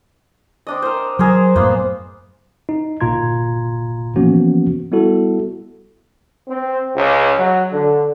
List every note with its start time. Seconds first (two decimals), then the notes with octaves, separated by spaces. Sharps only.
0.67 C4 D4 D#5
0.82 A#4 C5
1.19 F#3 G#4 A#4 C5
1.56 F#2 A2 A#3 B3 C5
2.69 D#4
3.01 G1 A#2 F4 A#5 C6 G#6
4.16 E3 F3 A#3 B3 C#4 F#4
4.92 G3 B3 E4 F#4 A4
6.49 C4
6.96 C#2
7.38 F#3
7.72 D3